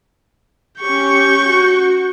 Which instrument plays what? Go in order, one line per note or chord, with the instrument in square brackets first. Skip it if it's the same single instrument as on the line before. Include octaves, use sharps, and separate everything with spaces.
[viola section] C#4 G4 [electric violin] C#6 G6
[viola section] F#4